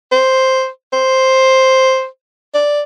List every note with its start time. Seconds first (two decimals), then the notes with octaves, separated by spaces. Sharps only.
0.12 C5
0.93 C5
2.54 D5